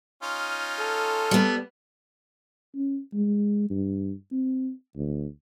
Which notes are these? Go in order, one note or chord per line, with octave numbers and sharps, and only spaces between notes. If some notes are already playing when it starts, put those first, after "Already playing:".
C#4 D#4 F4
A4
G3 B3
C#4
G#3
G2
C4
D2